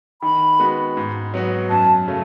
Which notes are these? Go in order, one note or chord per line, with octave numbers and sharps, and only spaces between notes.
D#3 B5
G#3 B3 F#4
G#2
F#3 B3 F#4
F#2 A5
C#3 F#3 A3